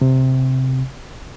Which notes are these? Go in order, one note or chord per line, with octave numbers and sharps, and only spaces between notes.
C3